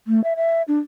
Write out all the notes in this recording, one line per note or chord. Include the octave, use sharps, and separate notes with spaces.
A3
E5
E5
D4